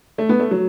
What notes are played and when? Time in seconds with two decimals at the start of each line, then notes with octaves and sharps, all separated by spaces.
0.18 A3
0.29 B3
0.39 A3
0.51 F#3